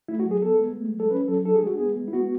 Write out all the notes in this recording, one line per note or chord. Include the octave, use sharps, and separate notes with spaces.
A3 E4
F#4
F#3
G#4
B3 A4
G#3
A3
F#3
A4
C#4 B4
F#3 A4
D4 A4
G#4
G#3 F#4
B3 G#4
G#3
E4
B3 F#4